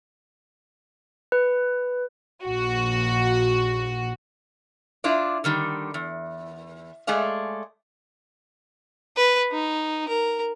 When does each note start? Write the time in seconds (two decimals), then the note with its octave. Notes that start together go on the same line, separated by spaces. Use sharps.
1.32 B4
2.44 A#1 F#4
5.04 D4 E4 F4 D5
5.44 D3 D#3 G3
5.94 E2
7.07 G#3 A3 G#4 D5 F5
9.16 B4
9.51 D#4
10.08 A#4